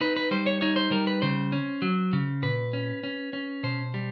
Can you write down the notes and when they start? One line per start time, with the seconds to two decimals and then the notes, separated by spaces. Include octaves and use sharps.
0.01 D#4 B4
0.16 B4
0.31 G3 C5
0.46 C#5
0.61 D#4 C#5
0.76 C5
0.91 G3 A#4
1.07 B4
1.22 C#3 C5
1.52 C#4
1.82 F#3
2.13 C#3
2.42 A#2 B4
2.73 C#4
3.03 C#4
3.33 C#4
3.63 B2 C5
3.94 G3